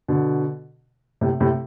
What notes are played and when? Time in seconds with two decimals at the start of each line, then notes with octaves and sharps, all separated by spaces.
0.08 B2 D3
1.21 A2 C3
1.40 A2 C3